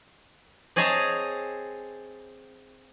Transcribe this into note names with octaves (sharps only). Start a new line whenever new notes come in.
C4 G#4 C#5 D#5 A5 A#5